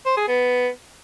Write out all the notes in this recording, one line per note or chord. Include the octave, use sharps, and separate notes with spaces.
C5
G#4
B3